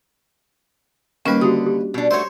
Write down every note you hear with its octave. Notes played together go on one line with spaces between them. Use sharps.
D#2 G3 A#3 C#4 B4
D3 F#4 G4 D#6
G4
B2 D4
A3 F#4 C5 C#5